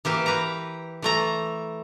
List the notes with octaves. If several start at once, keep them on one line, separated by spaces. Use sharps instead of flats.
E3 A#3 G4
B4 A#5
E3 A3 A#5